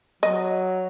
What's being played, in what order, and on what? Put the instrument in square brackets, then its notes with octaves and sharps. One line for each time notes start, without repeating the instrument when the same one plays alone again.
[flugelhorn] F#3 [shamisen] D#5